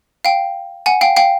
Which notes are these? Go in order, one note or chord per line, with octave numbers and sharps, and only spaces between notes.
F5 G5
F#5 G#5
F5 G5
F5 G5